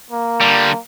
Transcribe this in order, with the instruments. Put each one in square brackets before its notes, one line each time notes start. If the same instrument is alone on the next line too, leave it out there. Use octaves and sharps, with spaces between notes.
[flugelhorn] A#3
[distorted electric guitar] D3 G3